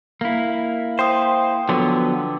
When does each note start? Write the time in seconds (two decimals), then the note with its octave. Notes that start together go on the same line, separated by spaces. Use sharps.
0.21 A#3 E4
0.99 C5 G5 C6 D#6
1.69 D3 F3 F#3 B3